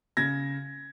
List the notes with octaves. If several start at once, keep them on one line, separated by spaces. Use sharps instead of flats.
C#3 G#6 A#6